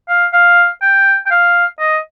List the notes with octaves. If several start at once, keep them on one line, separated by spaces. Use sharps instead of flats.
F5
F5
G5
G5
F5
D#5